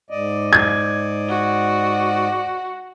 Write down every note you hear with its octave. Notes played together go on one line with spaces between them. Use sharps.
G#2 D5 D#5
G#6
F#4